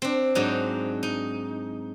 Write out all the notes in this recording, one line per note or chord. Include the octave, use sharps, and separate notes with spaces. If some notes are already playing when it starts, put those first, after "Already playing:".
C4 D4
G#2 F#3 D4 D#4
D#4